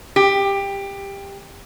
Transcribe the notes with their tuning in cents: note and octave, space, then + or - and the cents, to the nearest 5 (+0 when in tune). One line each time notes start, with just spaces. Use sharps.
G4 +15